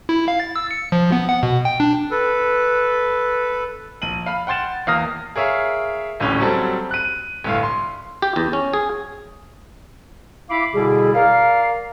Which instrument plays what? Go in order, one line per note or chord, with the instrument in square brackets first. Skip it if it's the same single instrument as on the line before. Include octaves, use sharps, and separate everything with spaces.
[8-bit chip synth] E4
F5
A6
E6
C#7
F3
B3
F#5
B2
G5
D4
[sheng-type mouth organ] A4 B4
[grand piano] A#1 D#7 F#7
F5 B5 F6
F#5 G5 C6 A6 E7
E2 A#3 F5 D#6 F6 A#6
G#4 A#4 C#5 E5 F5
D#1 A1 D2 A2 C#4
F#3 G3 C4 A4
F#6 D#7
G1 A2 F5
C6
[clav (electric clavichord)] G4
E2
C#4
G#4
[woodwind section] E4 F5 B5 D6
B2 D3 G3 E4 G#4
A#4 D5 F5